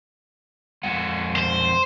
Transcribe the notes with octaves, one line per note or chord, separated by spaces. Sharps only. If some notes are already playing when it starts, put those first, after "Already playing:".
F2 G#3 F#5
C5